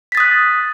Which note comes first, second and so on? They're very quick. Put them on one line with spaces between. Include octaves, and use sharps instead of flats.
B6 A6 D#6 F#6